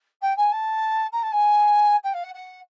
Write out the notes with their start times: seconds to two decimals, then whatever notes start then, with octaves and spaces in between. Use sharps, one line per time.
0.21 G5
0.37 G#5
0.52 A5
1.12 A#5
1.22 A5
1.32 G#5
2.03 G5
2.13 F5
2.23 F#5
2.34 F#5